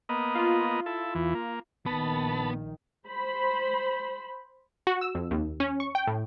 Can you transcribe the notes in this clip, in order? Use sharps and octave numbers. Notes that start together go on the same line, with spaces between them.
A#3 B3 D#5
F4
E4 A4
E2 E3
A#3
A#1 D#3 B3 A5 B5
C5 B5
F#4
E6
F2
D#2
C#4
C#6
G5
A2